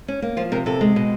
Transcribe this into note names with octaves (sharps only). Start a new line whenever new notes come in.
C#4
A#3
F3 F4
C3 A#4
C3 A4
G#3
B2